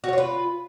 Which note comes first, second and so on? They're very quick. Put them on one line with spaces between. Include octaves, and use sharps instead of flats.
F#4 C#5 F4 B4